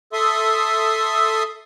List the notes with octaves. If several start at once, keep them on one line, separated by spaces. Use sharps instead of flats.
A4 E5 C6 D#6